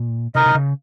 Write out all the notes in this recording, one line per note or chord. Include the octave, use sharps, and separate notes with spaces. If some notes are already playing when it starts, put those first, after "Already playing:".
Already playing: A#2
C3 D#4 A#4 D#5
C3
C#3